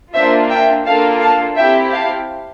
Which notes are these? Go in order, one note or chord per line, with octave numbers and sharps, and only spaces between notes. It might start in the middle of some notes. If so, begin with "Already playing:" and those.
A#3 D4 F4 C5 E5
E5 G5
A#3 D4 F4 A4 F5 A5
F5 A5
C4 E4 G4 E5 G5
F5 A5